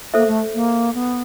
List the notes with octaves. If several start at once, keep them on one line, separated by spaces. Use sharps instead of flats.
A#3 A4 C5 E5
A3
A#3
B3